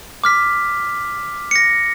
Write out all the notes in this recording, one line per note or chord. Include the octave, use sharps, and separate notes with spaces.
D6 F6 B6
A#6 C#7